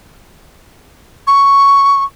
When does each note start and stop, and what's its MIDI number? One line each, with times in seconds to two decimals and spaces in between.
1.27 2.04 85